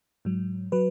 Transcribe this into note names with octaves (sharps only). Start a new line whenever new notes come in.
G#2 F#3
F#3 B4